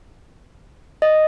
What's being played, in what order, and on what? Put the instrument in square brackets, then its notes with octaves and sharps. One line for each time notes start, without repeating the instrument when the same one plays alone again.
[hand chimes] D#5